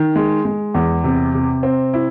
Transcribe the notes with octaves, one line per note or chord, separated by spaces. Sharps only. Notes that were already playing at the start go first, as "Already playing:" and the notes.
Already playing: D#3
G#3
G#3
E2
C3
C3
C4
E4